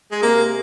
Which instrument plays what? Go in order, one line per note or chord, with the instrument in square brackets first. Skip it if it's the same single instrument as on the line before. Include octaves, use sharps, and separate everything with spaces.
[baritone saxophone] G#3
[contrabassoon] C3 [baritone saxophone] A#3